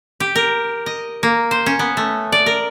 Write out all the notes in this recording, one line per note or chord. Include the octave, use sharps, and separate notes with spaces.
G4
A#4
D#5
A#3
C5
C#4
B3
A3
D5
A#4